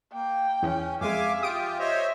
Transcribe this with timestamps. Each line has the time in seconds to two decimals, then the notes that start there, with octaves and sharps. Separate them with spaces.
0.13 A#3 G5
0.62 E2 C#4
1.01 F2 G#3 E5 F5 G#5 D6
1.43 F4 G4 D#6 D7
1.79 C5 C#5 D#5 E5